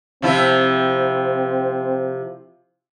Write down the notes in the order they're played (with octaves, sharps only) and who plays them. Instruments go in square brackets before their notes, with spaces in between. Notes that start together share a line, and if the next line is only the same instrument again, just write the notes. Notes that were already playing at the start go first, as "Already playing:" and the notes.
[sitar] C3 F3 E4 [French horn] C4